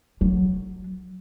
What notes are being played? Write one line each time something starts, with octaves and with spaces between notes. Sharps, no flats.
F#3